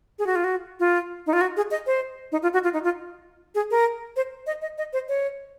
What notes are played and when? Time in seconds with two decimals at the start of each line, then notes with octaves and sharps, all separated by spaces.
0.19 G#4
0.26 F#4
0.35 F4
0.44 F#4
0.80 F4
1.27 D#4
1.33 F4
1.41 F#4
1.57 G#4
1.71 D#5
1.86 C5
2.32 D#4
2.43 F4
2.53 F#4
2.64 F4
2.74 D#4
2.84 F4
3.55 G#4
3.71 A#4
4.16 C5
4.47 D#5
4.62 D#5
4.78 D#5
4.93 C5
5.09 C#5